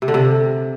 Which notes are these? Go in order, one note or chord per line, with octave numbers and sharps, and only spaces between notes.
C3
D3
C3